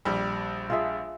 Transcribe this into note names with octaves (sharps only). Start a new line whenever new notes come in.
A#1 G3
F4 G#4 E5